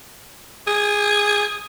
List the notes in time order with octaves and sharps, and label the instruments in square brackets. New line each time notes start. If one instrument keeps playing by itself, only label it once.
[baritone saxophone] G#4